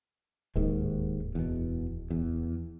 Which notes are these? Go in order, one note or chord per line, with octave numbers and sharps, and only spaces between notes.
D1 D#2 G#2 D#3
E2 B2
E2